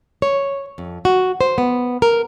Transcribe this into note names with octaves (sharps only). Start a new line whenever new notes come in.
C#5
F2
F#4
C5
B3
A#4